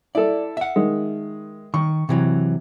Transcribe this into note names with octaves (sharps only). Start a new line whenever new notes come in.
E4 A4 D5
E5 F#5
D#3 G#3
D#3 C#6
C3 E3 F#3